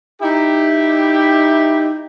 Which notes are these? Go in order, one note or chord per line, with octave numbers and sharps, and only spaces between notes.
D#4 E4 G4